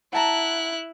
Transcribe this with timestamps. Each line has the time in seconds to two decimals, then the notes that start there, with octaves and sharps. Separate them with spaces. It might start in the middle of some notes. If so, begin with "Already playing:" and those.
0.13 E4 F#5 A5 A#5 F#6